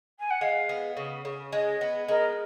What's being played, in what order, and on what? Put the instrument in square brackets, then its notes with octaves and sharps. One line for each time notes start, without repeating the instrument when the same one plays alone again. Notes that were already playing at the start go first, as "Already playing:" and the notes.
[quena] G#5
F#5
[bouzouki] G#3 [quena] F5
[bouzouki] B3
C#3
C#3
[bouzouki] G#3 [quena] D#5
[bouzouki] B3
[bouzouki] G#3 [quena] A#4